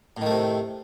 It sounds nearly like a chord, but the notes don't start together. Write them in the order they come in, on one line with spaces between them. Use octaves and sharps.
A2 D#3 A3 C3